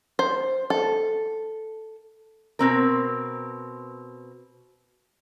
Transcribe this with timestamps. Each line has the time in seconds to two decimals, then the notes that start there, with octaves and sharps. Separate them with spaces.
0.19 C5
0.70 A4
2.59 B2 C4 A#4